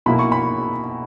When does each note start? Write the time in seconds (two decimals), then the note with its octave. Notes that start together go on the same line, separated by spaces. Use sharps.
0.06 B1 B2 A#3 E4 B5
0.19 C#6
0.32 B5